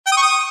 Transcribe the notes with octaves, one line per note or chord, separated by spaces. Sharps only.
G5
D#6
C#6
D#6